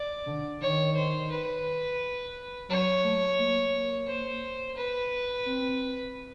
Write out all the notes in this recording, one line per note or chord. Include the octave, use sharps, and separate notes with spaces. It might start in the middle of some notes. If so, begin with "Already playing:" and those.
Already playing: D5
D3
D#3 C#5
C5
B4
F#3 C#5
A3
A#3
A#3
C5
B4
C4